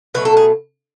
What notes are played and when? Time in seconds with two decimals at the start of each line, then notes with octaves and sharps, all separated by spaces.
0.14 B2 F#3 A3 B4
0.25 A4
0.37 G#4